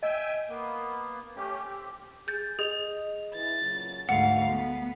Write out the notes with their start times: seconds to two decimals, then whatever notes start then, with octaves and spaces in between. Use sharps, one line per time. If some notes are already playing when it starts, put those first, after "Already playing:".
0.03 D#5 E5 G5 G#5
0.49 A#3 B3
1.36 A3 C#4 G4
1.65 C4 G4
2.28 G#4 G6 A6
2.59 G#4 D#5 F7
3.34 E3 A6
3.62 A#2 C#3 F#3
4.09 D2 G#2 A3 F5 F#5
4.50 B3